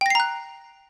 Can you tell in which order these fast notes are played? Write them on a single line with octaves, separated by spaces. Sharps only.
G5 A#6 C7 A#5 F#6